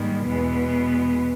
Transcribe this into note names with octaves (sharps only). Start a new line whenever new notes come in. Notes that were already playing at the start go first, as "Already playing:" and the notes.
Already playing: G#2 D#3 G3 A#3
E2 B2 G#3 B3